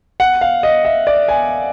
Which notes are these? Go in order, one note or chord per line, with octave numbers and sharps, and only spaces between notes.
F#5
F5
D#5
E5
D5
G#5